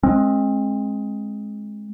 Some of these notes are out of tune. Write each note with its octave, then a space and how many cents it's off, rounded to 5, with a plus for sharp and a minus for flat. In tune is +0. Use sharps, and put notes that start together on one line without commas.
G#3 +10 C4 +40